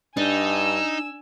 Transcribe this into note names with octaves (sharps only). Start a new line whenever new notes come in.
G2 D4 D#4 G#5 E6